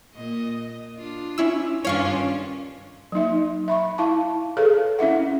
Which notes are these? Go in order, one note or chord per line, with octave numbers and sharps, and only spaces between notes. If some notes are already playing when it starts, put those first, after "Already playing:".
A#2 D#5
D4 F4
C#4 E4 E6
G2 D#3 C#4 D4 F4 C#5 F5 C#6
F#3 A#3 D#4 E5
E5 B5 C#6
E4 F5 A5 C#6
G#4 A4 B4 C#5 F5
C#4 E4 E5 F#5